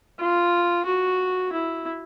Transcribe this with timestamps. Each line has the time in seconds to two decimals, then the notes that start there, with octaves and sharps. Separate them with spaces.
0.19 F4
0.86 F#4
1.52 E4